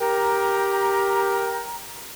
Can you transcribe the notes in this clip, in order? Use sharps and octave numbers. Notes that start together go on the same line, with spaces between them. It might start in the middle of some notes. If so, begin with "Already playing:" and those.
G4 A#4 G5 A#5